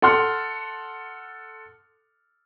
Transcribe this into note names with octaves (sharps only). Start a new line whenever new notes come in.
A4 F#5 C6 F6